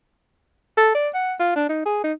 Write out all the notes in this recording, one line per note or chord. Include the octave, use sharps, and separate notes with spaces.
A4
D5
F#5
F4
D4
D#4
G#4
D#4